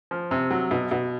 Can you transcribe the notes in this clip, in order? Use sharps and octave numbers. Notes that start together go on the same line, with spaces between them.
F3
C3
F#3
B2
B2